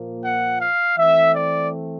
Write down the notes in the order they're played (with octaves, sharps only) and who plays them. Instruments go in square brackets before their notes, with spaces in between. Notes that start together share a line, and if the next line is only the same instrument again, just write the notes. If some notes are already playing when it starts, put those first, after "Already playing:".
Already playing: [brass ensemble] A#2 F3 A#3
F#5
F5
E3 A3 C4 E5
D5